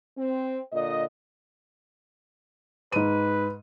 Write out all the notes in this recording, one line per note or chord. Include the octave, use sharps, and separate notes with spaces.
C4
A#2 D3 D#5
G#2 B4 D#7